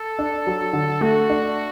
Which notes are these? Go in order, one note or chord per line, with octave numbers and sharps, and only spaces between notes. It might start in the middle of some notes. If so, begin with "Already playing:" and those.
Already playing: A4
D4
F#3
D3
A3 F#4
D4